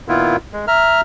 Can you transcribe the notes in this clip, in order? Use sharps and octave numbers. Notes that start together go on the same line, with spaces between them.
A#2 D#3 B3 E4 F4
G#3
E5 A#5 F6